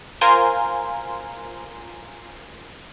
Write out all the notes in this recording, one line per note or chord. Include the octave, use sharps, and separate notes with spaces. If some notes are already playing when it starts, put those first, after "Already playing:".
F4 A#4 C5 G#5 C6